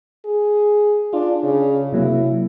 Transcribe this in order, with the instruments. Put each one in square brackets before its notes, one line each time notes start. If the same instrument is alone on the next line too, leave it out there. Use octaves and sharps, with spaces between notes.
[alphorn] G#4
[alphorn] D4 [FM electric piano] F4
[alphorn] C#3
[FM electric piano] C3 F#3 A#3 [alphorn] E4